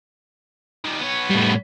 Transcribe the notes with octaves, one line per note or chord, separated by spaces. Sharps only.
D#3 G3
B3 C#5
A2 G3